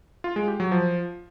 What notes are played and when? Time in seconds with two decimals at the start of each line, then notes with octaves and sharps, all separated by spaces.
0.24 F4
0.36 G#3
0.48 G4
0.60 F#3
0.72 F3